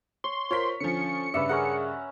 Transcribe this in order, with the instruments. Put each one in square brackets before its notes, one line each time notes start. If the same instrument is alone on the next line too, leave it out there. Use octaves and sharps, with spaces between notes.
[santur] C#5 [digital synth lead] C6
[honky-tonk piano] F4 A#4 B6 [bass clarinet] C5 [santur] C#5
[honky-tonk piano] D3 F3 [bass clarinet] C#4 [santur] C#5 [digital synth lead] C#7
[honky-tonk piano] G2 C#3 [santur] B4 D5 E5
[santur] C#4 A#4 F#5 [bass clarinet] G#4